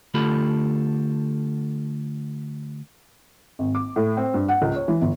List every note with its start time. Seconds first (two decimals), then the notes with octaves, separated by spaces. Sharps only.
0.14 D3 A3 F4 G4 A4 B5
3.59 G#1
3.75 D6
3.96 A2
4.17 C4
4.34 G2
4.48 F#5
4.62 C#2
4.76 C#5
4.88 E3
5.01 G1